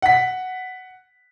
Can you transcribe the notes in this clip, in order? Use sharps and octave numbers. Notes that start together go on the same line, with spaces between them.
F#5 B6